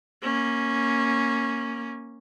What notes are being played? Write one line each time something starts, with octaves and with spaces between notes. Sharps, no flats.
A#3 C#4